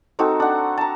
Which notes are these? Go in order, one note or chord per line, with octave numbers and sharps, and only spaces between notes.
C4 D#4 F#4 A4
D4 F#5
A5 A#5